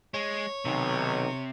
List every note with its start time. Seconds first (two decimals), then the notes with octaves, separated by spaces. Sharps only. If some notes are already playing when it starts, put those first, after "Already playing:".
0.14 G#3 C#5
0.65 B1 C3 D#3